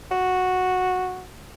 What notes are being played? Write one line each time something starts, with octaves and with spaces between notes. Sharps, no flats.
F#4